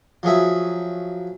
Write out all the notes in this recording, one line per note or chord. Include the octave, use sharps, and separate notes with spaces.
F3 F#3 G#4 E5